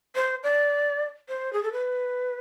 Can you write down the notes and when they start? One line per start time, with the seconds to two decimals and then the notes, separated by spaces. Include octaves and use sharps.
0.15 C5
0.43 D5
1.29 C5
1.53 G#4
1.63 A4
1.72 B4